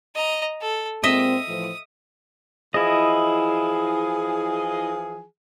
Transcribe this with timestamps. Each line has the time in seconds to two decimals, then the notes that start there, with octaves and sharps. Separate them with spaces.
0.15 D#5 A#5
0.61 A4
1.03 A#2 G#3 C4 D#5 E5 D#6
1.48 A2 E3 F3
2.74 E3 F3 E4 G#4 D#5